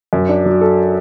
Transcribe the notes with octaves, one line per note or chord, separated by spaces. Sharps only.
F#2
D4
F#3
A4